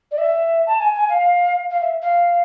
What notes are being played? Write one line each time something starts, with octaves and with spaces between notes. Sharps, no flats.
D5
E5
A5
G#5
G#5
F5
F5
E5
F5